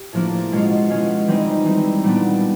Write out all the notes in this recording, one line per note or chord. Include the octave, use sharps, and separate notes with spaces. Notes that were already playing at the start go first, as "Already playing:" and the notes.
Already playing: G4
A2 F3 A#3 D4
B2 G#3 C#4 F4
B2 G#3 C#4 F4
E3 G3 C4 D#4
E3 G3 C4 D#4
A#2 G3 B3 D4